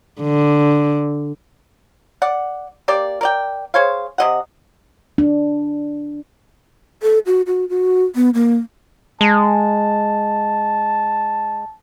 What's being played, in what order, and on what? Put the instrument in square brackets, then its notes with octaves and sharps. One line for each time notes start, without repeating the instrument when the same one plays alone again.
[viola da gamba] D3
[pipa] D5 F#5
A#3 G4 D5
A#4 D5 G5
G#4 C5 C#5 F5
C3 D#5 F#5
[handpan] D4
[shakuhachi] A4
F#4
F#4
F#4
B3
A#3
[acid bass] G#3 [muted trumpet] A5